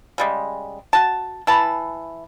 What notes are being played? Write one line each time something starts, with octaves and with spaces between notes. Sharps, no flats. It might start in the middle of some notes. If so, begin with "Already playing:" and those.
C#3 G3 G#3
F#4 A5
E3 A5 B5